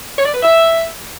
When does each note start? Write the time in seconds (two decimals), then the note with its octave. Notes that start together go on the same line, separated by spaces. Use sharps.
0.17 C#5
0.26 D5
0.34 B4
0.42 E5